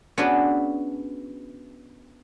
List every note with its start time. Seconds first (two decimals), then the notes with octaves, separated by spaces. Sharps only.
0.18 B3 C#4 D4 F#4 G#4 B4